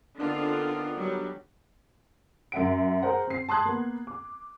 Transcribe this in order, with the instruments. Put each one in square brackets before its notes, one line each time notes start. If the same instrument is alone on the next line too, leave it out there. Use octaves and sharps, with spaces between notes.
[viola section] D3 C4 F4 [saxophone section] D#3 B3 D4
[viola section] F#3 G3
[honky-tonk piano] F#2 E5 F#5 D7
G#4 A#4 C5 F#5
C4 C7
A5 C6 D#6 F#6 G#6
A#3 B3
D6